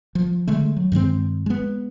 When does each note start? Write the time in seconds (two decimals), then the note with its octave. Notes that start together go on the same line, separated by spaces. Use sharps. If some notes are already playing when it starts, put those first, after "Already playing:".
0.15 F3
0.47 D3 G#3 A3
0.77 F#3
0.92 G2 D#3 G#3 C4
1.46 G#3 B3